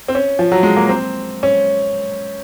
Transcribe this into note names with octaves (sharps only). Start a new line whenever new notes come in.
C4
C#4
F3
F#3
G#3
A#3
C4
C#4